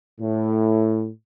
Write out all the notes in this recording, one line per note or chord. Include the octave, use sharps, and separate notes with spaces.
A2